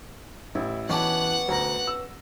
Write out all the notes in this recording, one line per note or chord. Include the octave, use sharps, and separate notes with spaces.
A1 E4
B2 E3 C#4 G4 F#5 A5 F#6
D2 A#5 A#6
E6